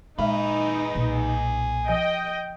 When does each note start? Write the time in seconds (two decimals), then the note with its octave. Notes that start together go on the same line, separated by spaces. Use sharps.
0.19 A#2 G#3 D#4 G#4 B4 E5
0.95 B1 A#2
1.88 F3 D#5 G5 G#5